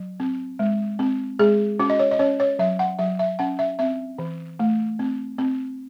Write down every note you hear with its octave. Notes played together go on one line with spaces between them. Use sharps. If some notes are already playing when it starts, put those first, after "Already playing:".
Already playing: F#3
C4
G#3
C4
G#3 G#4
C#4 F#4
D#5
C#5
D#5
C#4 C#5
C#5
F#3 E5
F#5
F#3 E5
E5
C#4 F#5
E5
C4 E5
E3
A3
C4
C4